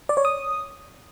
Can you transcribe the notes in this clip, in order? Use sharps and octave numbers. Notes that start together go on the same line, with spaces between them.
D5
C#5
D#6